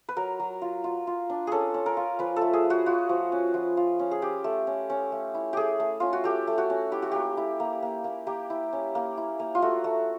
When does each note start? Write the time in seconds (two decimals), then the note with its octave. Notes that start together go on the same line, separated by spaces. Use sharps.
0.09 B4
0.17 F#3 A#4
0.39 F#3
0.62 F4
0.84 F4
1.07 F4
1.30 D4
1.47 C#4 G#4 A4
1.74 C#4
1.86 A#4
1.97 F4
2.19 F3 B4
2.36 A4
2.41 A3
2.53 G#4
2.65 F4
2.70 F#4
2.86 F4 F#4
3.09 F3
3.32 C#4
3.54 F3
3.77 F4
3.99 C#4
4.11 G#4
4.22 C#4 G4
4.44 A3
4.67 C#4
4.90 C#4
5.12 A3
5.34 E4
5.53 A3 G4 G#4
5.80 A3
6.00 C#4 F4
6.13 F#4
6.24 A3 G4
6.47 A3
6.58 F#4
6.70 C#4
6.92 E4 G4
7.02 F#4
7.12 A#3 G4
7.37 E4
7.60 A#3
7.82 A#3
8.04 A#3
8.27 A#3 G4
8.50 E4
8.73 C#4
8.95 A#3
9.17 E4
9.40 A#3
9.55 F4
9.62 A3 F#4
9.84 A3